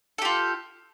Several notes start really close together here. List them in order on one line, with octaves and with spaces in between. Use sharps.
A4 G4 F4